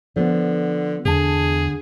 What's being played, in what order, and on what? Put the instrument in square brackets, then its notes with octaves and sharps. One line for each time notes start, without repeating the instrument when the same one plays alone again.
[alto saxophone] D3 [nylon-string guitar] F3 B3
[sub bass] E2 [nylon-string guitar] D3 A5 [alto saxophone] G#4